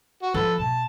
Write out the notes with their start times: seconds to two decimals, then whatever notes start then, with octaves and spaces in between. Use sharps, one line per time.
0.23 F#4
0.34 F3 A4 B4
0.58 B2 A5